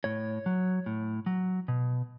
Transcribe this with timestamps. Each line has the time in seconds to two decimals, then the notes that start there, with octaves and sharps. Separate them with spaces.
0.04 A2 C#5
0.46 F#3
0.86 A2
1.26 F#3
1.68 B2